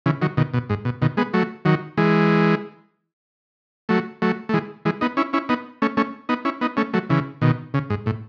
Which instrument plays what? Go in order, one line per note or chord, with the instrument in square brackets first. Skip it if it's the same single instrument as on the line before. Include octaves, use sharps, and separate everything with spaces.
[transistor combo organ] C#3 E3
D#3 F#3
B2 D#3
B2
G#2
B2
B2 D#3
G#3 B3
F#3 A3
D#3 F#3
E3 G#3
F#3 A3
F#3 A3
A3
E3 G#3
E3 G#3
B3 D#4
C#4 E4
C#4 E4
B3 D#4
A3 C#4
A3 C#4
B3 D#4
C#4 E4
B3 D#4
A3 C#4
F#3 A3
C#3 E3
B2 D#3
C#3
G#2
A2